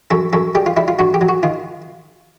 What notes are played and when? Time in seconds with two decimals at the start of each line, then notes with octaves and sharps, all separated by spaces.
0.11 F#2 A4
0.33 F#2 A4
0.55 G3 G4
0.66 F4
0.77 G3 E4
0.88 F4
0.99 G2 F#4
1.14 G4
1.21 F#3
1.29 F#4
1.43 D#3 F4